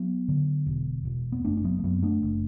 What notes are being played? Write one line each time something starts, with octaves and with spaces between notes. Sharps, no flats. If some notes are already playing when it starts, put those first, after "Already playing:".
Already playing: F#3 B3
D3
E1
E1
B3
F#1 A3 D4
D4
F#3 B3
A3
F#2 F#3 B3
B3
A3 D4
F#1